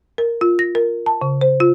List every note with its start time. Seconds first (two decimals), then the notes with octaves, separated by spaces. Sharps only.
0.18 A#4
0.41 F4
0.59 A#6
0.75 A#4
1.06 A5
1.22 C#3
1.41 C5
1.60 F4